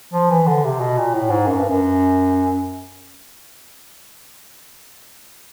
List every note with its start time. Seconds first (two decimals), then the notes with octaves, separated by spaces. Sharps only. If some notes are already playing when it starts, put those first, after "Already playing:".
0.13 F3
0.31 E3
0.47 D3
0.64 C3
0.80 B2
0.98 A#2
1.14 A2
1.30 G#2
1.47 F#2
1.59 G2
1.69 F#2